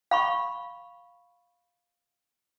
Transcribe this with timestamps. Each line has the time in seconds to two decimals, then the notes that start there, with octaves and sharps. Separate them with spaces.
0.11 F5 B5 C#6